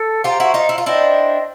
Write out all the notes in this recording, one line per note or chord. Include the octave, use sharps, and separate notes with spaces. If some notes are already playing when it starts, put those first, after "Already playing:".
Already playing: A4
F4 G4 C5 F5 A#5
E4 F#4
D#4 F4
E4
F4
D4 E4 C5 D#5 G5